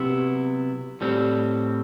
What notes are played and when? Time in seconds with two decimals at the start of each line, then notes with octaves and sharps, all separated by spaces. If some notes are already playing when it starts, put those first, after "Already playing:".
Already playing: C3 F#3 B3 E4
1.01 A2 G3 C4